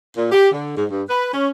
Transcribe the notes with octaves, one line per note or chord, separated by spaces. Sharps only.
A#2
G4
D3
G#2
G2
B4
C#4